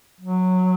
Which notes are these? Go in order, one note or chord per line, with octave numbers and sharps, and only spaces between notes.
F#3